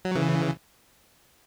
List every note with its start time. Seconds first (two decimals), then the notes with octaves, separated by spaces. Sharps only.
0.05 F#3
0.15 C#3 E3